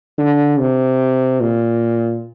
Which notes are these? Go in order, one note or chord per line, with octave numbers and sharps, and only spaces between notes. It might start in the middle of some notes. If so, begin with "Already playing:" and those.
D3
C3
A#2